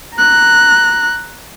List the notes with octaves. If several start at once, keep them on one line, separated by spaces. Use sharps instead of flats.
A#5 F#6